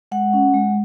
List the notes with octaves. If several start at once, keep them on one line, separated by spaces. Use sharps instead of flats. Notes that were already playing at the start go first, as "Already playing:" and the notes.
G#3 F#5
C#4
G#3